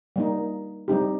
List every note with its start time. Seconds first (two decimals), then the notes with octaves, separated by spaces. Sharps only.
0.16 G3 A#3 D#4
0.88 G3 C4 D#4 G4